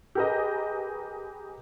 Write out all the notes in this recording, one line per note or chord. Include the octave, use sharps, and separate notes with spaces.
G4 G#4 A#4 B4 D#5